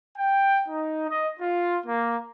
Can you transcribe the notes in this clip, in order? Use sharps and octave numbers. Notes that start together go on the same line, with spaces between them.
G5
D#4
D#5
F4
A#3